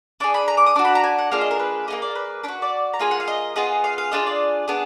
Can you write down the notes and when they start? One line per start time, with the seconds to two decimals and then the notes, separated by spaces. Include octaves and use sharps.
0.20 D4 G#4 D6
0.34 B5
0.48 A#5
0.57 D6
0.66 D#6
0.76 D4 F#4 D6
0.85 B5
0.95 A#5
1.04 G#5
1.19 F#5
1.31 A#3 D4 F4 G#4 F5
1.41 D#5
1.51 A#4
1.59 B4
1.88 A#3 D#4 G#4 D#5
2.02 D5
2.15 B4
2.44 D4 F#4 B4
2.62 D5
2.94 A#5
2.99 A#3 F4 G#4 G#5
3.11 F#5
3.20 F5
3.28 D#5
3.56 B3 F4 G#4 D#5
3.84 F5
3.98 F5
4.12 D4 F4 G#4 D#5
4.27 D5
4.68 B3 D4 G#4